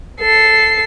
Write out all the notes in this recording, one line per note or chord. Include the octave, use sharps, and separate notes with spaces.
A4 C7